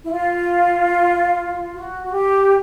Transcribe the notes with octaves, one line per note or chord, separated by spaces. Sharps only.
E4
F4
F#4
F#4
G4